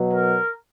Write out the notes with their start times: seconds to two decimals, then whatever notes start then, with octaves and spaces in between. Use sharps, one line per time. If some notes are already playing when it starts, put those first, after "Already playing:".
Already playing: B2 F#3
0.13 A#4